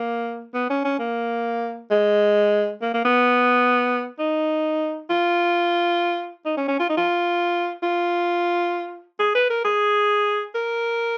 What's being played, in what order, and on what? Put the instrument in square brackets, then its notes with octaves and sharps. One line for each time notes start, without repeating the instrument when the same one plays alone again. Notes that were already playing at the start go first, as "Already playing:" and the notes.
Already playing: [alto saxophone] A#3
B3
C#4
C#4
A#3
G#3
A#3
A#3
B3
D#4
F4
D#4
C#4
C#4
F4
D#4
F4
F4
G#4
B4
A#4
G#4
A#4